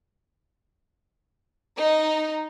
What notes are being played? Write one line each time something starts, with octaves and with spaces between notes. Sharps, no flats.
D#4